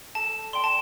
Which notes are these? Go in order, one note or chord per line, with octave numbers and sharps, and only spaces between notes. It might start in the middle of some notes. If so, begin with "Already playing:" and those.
A4 A5
D5 G5 C6
A5